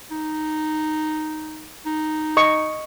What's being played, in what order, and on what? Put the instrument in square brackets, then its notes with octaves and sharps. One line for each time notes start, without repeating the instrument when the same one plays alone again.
[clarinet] D#4
D#4
[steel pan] D#5 C#6 D#6